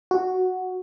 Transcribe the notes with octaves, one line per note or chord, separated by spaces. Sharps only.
F#4